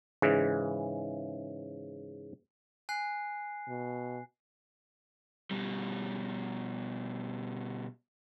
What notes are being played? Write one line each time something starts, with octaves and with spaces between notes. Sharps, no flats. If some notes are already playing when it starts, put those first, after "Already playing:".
G#2 C#3 E3
G#5 F#6 C7
B2
B2 G3